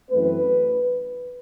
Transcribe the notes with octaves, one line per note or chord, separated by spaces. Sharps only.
F#2 E3 A3 C4 B4